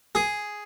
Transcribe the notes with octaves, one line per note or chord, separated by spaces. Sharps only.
G#4